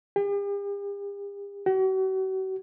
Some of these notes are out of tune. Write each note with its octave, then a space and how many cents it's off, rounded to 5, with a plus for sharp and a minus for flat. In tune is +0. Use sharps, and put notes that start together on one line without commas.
G4 +45
F#4 +45